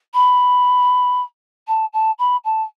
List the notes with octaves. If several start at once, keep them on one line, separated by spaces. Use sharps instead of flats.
B5
A5
A5
B5
A5